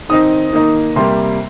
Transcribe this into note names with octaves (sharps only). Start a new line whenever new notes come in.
D#3 C4 D#4 D#6
D#3 A#3 D#4
C3 G3 A#3 C6